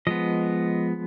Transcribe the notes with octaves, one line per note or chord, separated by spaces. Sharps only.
F3 G#3 B3 D#5